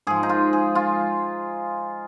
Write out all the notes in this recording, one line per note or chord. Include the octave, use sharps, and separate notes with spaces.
G#2 F3 G#4
D#4
F4
G#4
F4